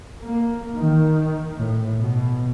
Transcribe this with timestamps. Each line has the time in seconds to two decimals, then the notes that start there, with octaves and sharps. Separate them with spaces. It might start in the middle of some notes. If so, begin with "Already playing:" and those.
0.23 A#3
0.78 D#3
1.57 A2
2.01 B2